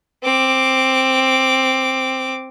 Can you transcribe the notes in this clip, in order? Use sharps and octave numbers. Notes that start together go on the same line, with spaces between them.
C4 D6